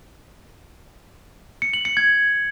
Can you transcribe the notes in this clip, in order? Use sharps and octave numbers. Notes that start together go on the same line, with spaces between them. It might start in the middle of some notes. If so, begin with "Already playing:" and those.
C#7
F#7
C#7
G#6